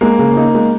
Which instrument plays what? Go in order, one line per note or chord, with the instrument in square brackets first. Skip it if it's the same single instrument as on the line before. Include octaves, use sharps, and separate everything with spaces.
[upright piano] G#3 [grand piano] A#3
[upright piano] C#3
D#4
G#3